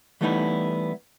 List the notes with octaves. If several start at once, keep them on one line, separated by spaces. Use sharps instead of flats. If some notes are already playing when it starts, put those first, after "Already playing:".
E3 G3 A3 B3 D#4 E4